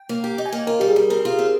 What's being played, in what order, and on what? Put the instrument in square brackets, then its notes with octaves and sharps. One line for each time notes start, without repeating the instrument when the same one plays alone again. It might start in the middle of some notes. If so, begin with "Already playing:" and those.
Already playing: [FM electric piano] G5
[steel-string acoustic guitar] A#3
[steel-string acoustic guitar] G4 [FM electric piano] G5
[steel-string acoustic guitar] D#4
[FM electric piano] G#5
[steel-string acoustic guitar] A#3
[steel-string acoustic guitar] F4 [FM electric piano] A#4
[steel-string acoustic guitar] G3 [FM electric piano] G4
[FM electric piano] G#4
[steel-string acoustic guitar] G3
[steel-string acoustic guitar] C4 [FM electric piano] A#4
[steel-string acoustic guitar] F4
C4